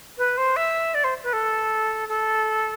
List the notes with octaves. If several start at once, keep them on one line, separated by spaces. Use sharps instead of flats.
B4
C5
E5
D5
C5
B4
A4
A4